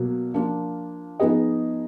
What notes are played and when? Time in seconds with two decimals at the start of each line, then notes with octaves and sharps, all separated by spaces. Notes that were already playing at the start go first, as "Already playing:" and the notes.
Already playing: B2 F#3 A#3
0.34 F3 A#3 D4 F4
1.20 F3 B3 D#4 G#4 D#5